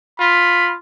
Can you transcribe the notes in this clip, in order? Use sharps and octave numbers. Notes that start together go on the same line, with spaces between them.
F4 B5